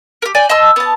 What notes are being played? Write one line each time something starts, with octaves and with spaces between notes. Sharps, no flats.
G4 A#4
D5 G5 G#5
D#5 A5 C6 E6
B3 A5